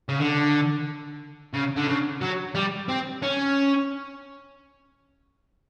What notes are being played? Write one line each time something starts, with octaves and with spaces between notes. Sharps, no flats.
C#3
D3
C#3
D3
C#3
F#3
G3
C4
C#4